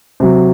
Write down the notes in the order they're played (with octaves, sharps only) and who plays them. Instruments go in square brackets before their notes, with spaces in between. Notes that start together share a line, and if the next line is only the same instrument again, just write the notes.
[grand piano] C3 F#3